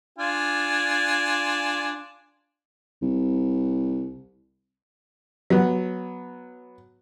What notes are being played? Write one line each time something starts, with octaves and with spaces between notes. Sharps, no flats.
D4 F4 G#5
C2
F#3 B3